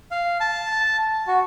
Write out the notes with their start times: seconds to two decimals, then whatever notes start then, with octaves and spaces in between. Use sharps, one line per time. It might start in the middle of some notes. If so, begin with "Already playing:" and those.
0.11 F5
0.40 A5
1.27 F#4